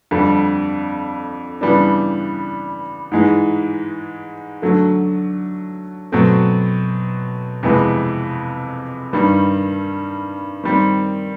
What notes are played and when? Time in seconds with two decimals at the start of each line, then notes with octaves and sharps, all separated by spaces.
0.11 F2 D3 G3
1.61 C#3 E3 G3 B3 D4
3.12 G#2 E3 G#3
4.62 D3 F#3 A3
6.12 B2 F#3 A3 C4
7.63 F2 C3 E3 G#3 B3
9.13 G2 D#3 G3
10.64 D#3 G3 C4